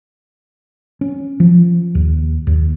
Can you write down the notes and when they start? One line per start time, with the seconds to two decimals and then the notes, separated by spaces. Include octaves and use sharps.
1.01 C#4
1.40 F3
1.95 D#2
2.47 D#2